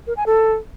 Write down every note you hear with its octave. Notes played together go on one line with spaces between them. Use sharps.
A#4
G#5
A4